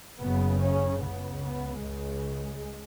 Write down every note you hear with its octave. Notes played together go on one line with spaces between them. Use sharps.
F#1 F#2 C#3 B3
C#4
C#2 C#3 B3
B3
C#2 C#3 G#3